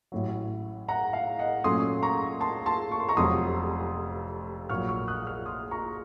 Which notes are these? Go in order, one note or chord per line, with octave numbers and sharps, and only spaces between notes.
A1 A2 F#3
F#5 A#5
F5
D#5 F#5
A#2 F#3 A3 C#4 C6 D#6
A#5 C#6
A5 C6
A5 C6
C#6
C6
A#5 C#6
F1 F2 C3 F#3 C6 D#6
A#1 A#2 F#3 C#6 F6
C#6 F6
D#6 F#6
C#6 F6
C6 D#6
A#5 C#6